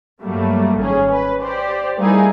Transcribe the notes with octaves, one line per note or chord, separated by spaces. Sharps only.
G2 F#3 G3 A3 A#3
G#1 C#4 G#4
B4
G4 C5 D5
G3 A3 A#3 D#4 E4 G#4